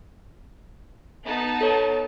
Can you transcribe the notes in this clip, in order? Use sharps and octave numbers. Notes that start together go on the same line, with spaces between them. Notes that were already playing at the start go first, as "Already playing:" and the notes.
B3 D#4 A5
A4 C#5